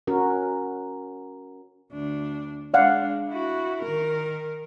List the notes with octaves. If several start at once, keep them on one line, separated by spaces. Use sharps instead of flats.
C#4 F#4 A#4
D2 D4
G#3 D4 D5 F5 F#5
E4 F#4
D#3 A#4